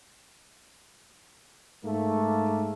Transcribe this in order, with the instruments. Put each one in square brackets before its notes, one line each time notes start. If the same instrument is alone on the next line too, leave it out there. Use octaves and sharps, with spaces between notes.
[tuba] G#2 [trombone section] A3 A#3